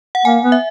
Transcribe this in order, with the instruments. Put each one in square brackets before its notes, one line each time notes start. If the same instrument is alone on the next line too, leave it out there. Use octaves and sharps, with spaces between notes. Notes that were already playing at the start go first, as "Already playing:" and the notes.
[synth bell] F#5
[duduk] A#3 [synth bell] G#5
[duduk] B3
[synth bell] E5